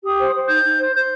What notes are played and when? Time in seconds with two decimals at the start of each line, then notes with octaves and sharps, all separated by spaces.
0.03 G4 D#6
0.18 C5
0.33 C5
0.48 D#4 G6
0.63 D#4
0.78 C5
0.94 C5 G6